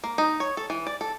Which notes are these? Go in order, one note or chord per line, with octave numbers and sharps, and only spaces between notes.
A#3
D#4
C#5
A4
E3
D5
A4